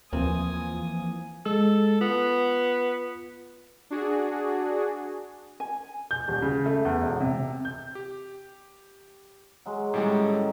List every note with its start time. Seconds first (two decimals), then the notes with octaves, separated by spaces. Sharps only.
0.13 D#2 E3 F3 A#3 C4 G#5 D#6
1.45 G#3 A4 E6
2.01 B3 F4
3.90 D4 F#4 G#4
5.60 G#5
6.11 G6
6.28 D#1
6.42 C#3
6.66 A3
6.85 E2
7.02 E1
7.21 C3
7.65 G6
7.95 G4
9.66 F#3 G#3
9.94 A2 D#3 G3 G#3 C#4 D6
10.21 D#4 A4